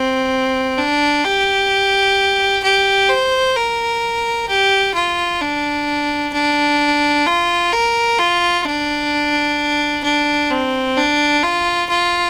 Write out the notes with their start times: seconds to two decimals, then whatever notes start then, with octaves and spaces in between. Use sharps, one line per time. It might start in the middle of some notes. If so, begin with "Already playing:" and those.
Already playing: C4
0.78 D4
1.24 G4
2.63 G4
3.09 C5
3.56 A#4
4.48 G4
4.94 F4
5.41 D4
6.33 D4
7.26 F4
7.73 A#4
8.18 F4
8.65 D4
10.04 D4
10.50 C4
10.97 D4
11.43 F4
11.89 F4